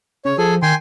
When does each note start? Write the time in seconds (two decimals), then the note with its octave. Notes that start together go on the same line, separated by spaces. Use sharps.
0.25 C#3 C#5
0.38 F3 G#4 A4 G#5
0.62 D#3 G5 G#5 C6